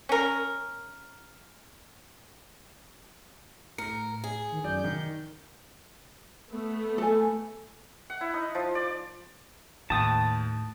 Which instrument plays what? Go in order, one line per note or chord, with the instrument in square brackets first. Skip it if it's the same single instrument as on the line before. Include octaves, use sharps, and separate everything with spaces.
[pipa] C#4 A#4
[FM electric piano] A2 [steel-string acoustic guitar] A#4 [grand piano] C#7
[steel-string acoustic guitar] G#4
[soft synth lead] D#3
[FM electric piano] F#2 [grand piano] D5 [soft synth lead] G6
[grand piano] D#3
[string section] A3 B3
[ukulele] A4 G#5
[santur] F#5
E4
D#4
F3
D5
[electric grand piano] D#2 G5 [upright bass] A2 [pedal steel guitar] A5 D#6